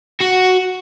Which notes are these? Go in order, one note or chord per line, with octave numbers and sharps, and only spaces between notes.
F#4